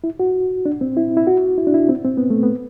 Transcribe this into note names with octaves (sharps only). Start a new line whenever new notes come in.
E4
F#4
D4
C4
E4
E4
F#4
E4
D4
E4
C4
C4
B3
A3
B3